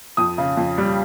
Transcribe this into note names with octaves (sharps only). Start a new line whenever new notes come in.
F2 D#6
C#3
F2
G3